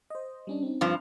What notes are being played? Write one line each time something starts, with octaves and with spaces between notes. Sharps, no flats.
C5 D#5
G3 C#4 D4
C4 D#4
G2 F3